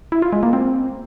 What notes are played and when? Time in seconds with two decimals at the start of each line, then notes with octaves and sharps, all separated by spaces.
0.12 E4
0.22 F4
0.33 G#3
0.43 A#3
0.53 C4